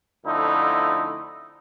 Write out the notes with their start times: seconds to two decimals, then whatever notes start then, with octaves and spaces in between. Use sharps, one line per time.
0.25 F2 D3 A3 D#4 E4